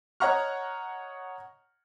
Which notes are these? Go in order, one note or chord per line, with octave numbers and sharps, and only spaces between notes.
C#5 D#5 F#5 A#5 C#6 F6